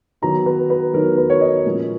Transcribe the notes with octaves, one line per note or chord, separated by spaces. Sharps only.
D#3 F#3 B3 D#4 A#5
B4
B4
D#3 F#3 B3 D#4 A#4
B4
C#5
D#5
A#2 F3 G#3 C#4